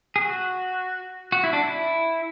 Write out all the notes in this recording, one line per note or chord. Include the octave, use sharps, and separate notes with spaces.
G#4
F#4
F#4
E4
D4
E4